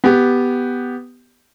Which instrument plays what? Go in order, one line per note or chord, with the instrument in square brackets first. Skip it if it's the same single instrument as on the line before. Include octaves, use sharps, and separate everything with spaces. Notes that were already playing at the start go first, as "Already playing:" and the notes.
[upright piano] B3 G4